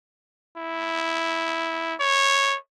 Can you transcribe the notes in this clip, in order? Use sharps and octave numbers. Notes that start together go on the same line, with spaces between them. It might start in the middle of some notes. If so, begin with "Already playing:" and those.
E4
C#5